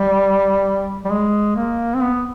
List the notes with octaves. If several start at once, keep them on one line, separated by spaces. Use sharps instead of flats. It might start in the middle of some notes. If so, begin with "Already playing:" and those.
Already playing: G3
G3
G#3
A#3
C4
B3